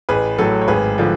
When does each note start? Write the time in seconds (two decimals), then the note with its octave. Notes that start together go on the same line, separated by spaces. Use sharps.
0.09 A1 G#4 B4
0.38 A2 F#3 A4
0.61 C#5
0.68 G#1 G#4 B4
0.98 D3 F3